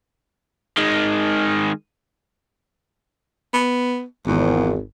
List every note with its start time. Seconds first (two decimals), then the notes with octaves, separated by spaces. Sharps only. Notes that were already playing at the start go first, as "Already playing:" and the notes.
0.77 D#3 G#3
3.54 B3
4.27 G#1 E2